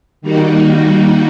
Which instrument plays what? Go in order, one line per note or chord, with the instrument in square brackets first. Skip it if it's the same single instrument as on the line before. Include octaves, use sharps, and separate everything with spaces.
[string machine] D#3 G3 A#3 D#4 F#4